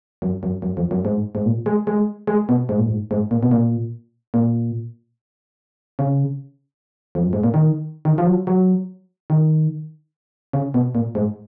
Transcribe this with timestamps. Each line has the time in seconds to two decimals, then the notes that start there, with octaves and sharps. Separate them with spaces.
0.22 F#2
0.43 F#2
0.62 F#2
0.77 F2
0.91 F#2
1.05 G#2
1.35 G#2
1.45 A#2
1.66 G#3
1.87 G#3
2.27 G#3
2.49 B2
2.69 G#2
2.78 A#2
2.88 G#2
3.11 G#2
3.31 A#2
3.43 B2
3.51 A#2
4.34 A#2
5.99 C#3
7.15 F2
7.23 F#2
7.33 G#2
7.44 A#2
7.54 D#3
8.05 D#3
8.18 F3
8.26 F#3
8.47 F#3
9.30 D#3
10.53 C#3
10.74 B2
10.95 A#2
11.15 G#2